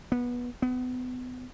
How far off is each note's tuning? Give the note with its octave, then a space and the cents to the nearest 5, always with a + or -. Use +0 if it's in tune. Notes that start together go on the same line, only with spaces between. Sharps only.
B3 -20
B3 +30